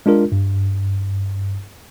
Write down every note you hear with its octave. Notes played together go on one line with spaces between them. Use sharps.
G#3 D4 F4 A#4
G2